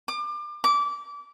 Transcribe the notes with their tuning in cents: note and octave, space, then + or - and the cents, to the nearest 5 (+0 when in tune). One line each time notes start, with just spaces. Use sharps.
D6 +30
D6 -25